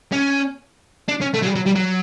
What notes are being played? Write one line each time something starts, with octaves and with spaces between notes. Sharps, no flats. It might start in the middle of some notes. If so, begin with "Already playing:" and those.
C#4
D4
C#4
A3
F#3
G3
F#3
G3
F#3